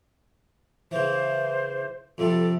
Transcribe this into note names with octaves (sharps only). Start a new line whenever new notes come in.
C#3 E3 C5
F2 C3 G3 A4